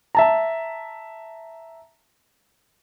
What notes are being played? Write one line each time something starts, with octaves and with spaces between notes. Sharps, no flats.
E5 A5 A#5